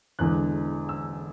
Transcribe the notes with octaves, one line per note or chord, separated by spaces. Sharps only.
E1 E2 D3 F#6
E6